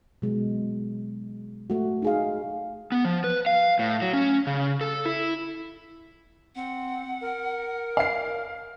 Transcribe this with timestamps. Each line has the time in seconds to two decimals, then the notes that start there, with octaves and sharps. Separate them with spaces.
0.22 B2 F#3 G#3
1.70 A3 F#4
2.02 D#4 G#4 F5
2.92 B3
3.05 F3
3.24 B4
3.46 F5
3.79 A2
4.02 F#3
4.14 C#4
4.47 C#3
4.81 A4
5.06 E4
6.56 C4 F#5
7.21 A#4
7.97 F5 C7